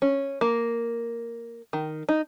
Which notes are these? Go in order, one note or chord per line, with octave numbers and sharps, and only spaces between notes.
C#4
A#3
D#3
D#4